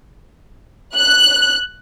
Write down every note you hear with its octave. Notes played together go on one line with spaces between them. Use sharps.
F#6